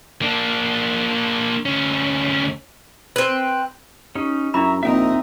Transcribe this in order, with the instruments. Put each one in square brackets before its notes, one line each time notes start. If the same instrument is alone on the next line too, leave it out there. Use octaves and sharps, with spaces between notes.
[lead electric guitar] A#3 D4
D2 C#4
[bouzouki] C4 B4
[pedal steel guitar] C#4 D#4 [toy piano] G4
[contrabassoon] F#2 [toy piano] D4 E4 B5 [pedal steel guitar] E5 A#5 C#6
[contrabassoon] A#1 [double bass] C4 D#4 [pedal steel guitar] E5 G5 A#5